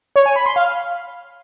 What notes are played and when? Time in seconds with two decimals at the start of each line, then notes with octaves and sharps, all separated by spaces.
0.16 C#5
0.26 G#5
0.36 B5
0.46 C6
0.56 F5